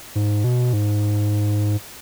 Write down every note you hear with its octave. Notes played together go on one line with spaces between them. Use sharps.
G#2
B2
G#2